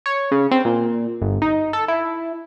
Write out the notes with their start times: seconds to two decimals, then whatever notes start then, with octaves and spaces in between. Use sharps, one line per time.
0.06 C#5
0.31 C#3
0.51 C4
0.65 A#2
1.21 G1
1.42 D#4
1.73 A4
1.88 E4